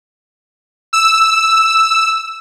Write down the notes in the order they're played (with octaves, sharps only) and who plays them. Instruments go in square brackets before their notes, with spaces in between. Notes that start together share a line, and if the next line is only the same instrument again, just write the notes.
[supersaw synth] E6